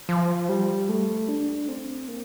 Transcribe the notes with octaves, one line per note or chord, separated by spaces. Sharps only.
F3
G3
A3
D4
C4
A#3